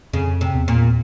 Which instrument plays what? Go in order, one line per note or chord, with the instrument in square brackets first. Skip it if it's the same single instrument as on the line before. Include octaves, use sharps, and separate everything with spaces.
[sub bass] F2 [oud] C#3
[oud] C3
[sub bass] E2
[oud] A#2